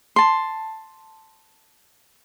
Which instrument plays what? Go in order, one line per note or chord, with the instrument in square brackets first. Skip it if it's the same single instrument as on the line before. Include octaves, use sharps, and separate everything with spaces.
[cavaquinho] A5 C6